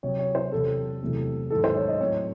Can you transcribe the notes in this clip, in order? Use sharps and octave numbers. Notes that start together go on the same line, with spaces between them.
C3 F#3 C4 C#5
C#5
C5
E2 C3 F#3 A4
E2 C3 F#3 A3 C4
G#2 D#3 F#3 A4
C5
C#5
D#5
A2 F#3 C4 C#5